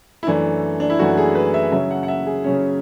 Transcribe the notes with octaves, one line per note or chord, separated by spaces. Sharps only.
E4
F#2 E3 A3 D4
D4
E4
F#2 E3 A3 F#4
G#4
B4
E5
C#3 F#3 C#4 E5
F#5
F#5
E5
G#4
C#3 F#3 C#4